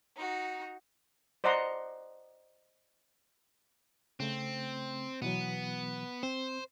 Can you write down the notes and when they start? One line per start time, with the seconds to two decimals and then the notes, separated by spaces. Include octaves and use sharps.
0.16 D#4 F#4
1.44 C5 D5 D#5 F#5 A#5 C6
4.20 C#3 A3 C4
5.22 B2 E3 F#3 B3
6.23 C4 C5